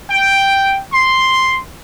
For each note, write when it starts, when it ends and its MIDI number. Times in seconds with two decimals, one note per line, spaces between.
0.11 0.80 79
0.93 1.60 84